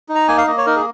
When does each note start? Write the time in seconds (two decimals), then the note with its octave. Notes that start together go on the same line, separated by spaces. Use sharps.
0.09 D#4
0.15 A#5
0.28 A#3 G#5
0.38 F5
0.47 A#3 D#5
0.57 C#5
0.66 D#4 A#4
0.76 G#4